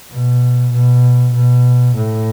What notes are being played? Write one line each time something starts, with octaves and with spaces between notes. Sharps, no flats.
B2
B2
B2
A2